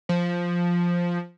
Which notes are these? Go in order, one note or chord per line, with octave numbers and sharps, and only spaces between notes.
F3